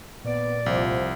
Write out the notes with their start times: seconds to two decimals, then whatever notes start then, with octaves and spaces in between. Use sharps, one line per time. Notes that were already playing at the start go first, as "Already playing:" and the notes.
0.24 A#2 B3 D5
0.66 C2 F3